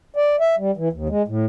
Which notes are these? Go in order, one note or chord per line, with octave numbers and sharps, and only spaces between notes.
D5
E5
G3
E3
D#2
G#3
A2